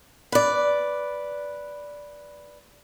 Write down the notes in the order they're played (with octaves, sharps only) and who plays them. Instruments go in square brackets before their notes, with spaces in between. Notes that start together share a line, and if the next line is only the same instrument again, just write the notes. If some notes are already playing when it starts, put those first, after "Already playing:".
[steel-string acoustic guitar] B4 D5